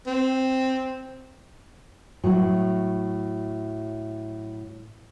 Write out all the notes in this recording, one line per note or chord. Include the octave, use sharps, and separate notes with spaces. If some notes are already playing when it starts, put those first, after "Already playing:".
C4
A2 F#3